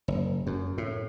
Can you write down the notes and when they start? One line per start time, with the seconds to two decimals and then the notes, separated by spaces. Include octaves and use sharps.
0.08 F#1
0.47 F#2
0.78 A2